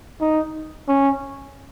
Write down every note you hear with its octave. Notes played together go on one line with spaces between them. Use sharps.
D#4
C#4